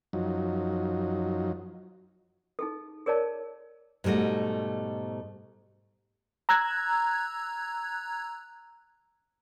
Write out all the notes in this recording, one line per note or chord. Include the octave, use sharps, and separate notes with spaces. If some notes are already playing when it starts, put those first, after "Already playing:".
F#2 F3 F#3 D#4
D#4 G#4 A4
G#4 A#4 C#5 D5 A5
G#2 B2 G3 A3 D#5
A#5 E6 F#6 G#6